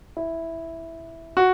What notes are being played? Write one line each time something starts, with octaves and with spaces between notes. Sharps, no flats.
E4
F#4